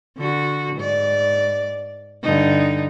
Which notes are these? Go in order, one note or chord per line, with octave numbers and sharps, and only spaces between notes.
D3 F#4
G#2 D5
G2 D3 D#4